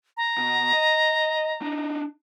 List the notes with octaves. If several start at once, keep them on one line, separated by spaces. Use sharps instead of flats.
A#5
B2
D#5
D4 D#4